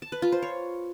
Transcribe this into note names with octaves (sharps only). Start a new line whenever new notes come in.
A5
B4
F4
C5
C#5